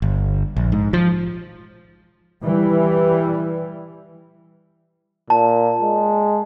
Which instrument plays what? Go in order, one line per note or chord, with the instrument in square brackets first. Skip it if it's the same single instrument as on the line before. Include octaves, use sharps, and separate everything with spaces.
[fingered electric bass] G1
A#1
G#2
F3
[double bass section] E3 G3
[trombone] A#2 [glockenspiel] A5
[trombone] G#3